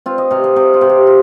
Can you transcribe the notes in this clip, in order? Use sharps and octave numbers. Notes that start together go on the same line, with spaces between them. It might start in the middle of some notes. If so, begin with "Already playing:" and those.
C4 F4
D#5
C3 F5
D#5
C3 G4
F4
C3
G4
F4